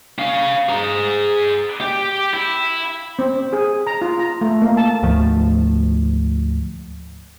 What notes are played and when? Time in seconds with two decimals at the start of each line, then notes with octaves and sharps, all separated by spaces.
0.19 C#4 F5
0.69 G#4 A#5
1.81 G4
2.33 E4
3.19 C4
3.53 G#4
3.87 A#5
4.02 F4
4.19 A#5
4.41 A3
4.62 A#3
4.77 A5
5.03 D2 G#2 F3 A3